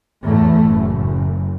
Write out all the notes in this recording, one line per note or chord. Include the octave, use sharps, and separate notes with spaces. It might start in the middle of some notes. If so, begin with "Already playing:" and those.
E2 A2 A3
F#1